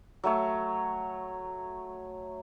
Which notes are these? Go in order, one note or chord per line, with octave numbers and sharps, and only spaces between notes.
F#3 A3 C#5